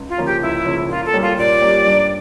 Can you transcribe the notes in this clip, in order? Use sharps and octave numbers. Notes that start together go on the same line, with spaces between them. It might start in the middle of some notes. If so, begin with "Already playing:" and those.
Already playing: C#2
F4
C#3 F3 A#3 C#4
G4
C#2 E4
C#3 F3 A#3 C#4
A#2 F4
A4
G3 A#3 C#4 G4
F4
A#2 D5
G3 A#3 C#4 G4
G2